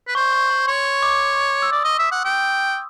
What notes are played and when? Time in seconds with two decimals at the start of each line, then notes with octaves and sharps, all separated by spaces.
0.08 B4
0.15 C5 C#6
0.32 C#6
0.50 C6
0.67 C#5 C6
0.85 C#6
1.03 D6
1.62 E6
1.72 D5 D#6
1.85 D#5
1.99 E5
2.12 F#5
2.25 G5